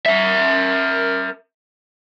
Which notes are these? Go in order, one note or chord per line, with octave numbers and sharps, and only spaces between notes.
A#4 E5